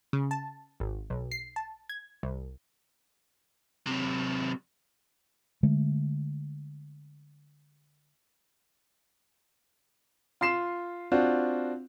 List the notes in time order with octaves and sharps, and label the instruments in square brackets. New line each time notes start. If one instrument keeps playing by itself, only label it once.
[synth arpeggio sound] C#3
A5
G#1
B1
C7
A5
G#6
C2
[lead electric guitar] C3 F#3
[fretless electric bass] D3 G#3 A3
[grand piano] F4 C6 C7 E7
C4 D4 F4 F#4